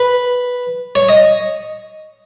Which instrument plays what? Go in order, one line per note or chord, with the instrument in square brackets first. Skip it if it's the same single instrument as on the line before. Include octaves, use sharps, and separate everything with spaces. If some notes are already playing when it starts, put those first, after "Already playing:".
Already playing: [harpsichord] B4
C#5
D#5